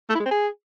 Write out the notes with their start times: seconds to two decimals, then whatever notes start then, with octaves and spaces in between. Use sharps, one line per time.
0.10 A3
0.15 E4
0.20 G#3
0.26 C4
0.31 G#4